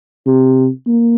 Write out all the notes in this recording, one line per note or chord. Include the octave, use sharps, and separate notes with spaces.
C3
A#3